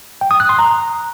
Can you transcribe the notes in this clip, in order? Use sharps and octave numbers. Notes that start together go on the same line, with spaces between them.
G5
D#6
F#6
C6
A#5